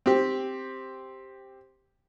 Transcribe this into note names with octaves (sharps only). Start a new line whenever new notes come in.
C4 G4